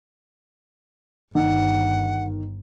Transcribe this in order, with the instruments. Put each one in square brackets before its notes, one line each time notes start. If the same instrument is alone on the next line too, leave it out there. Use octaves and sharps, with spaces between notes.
[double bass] G1 [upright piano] D#3 [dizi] F#5